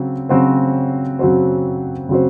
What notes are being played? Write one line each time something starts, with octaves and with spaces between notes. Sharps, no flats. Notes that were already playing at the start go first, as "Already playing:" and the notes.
Already playing: C#3 F#3 C4
C#3 F#3 C4 F#4 C5
C#3 F#3 C4 F#4 C5
C#3 F#3 C4 F#4 C5